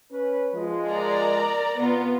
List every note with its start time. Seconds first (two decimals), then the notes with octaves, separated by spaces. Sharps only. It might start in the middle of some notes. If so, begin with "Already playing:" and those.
0.11 C#4 B4
0.54 F3 G#3
0.89 A#4 D5 A#5
1.79 C3 B3 F4